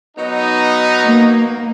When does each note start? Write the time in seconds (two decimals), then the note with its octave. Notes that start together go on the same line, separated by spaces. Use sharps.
0.17 F#3 B3 D#4
1.05 A#3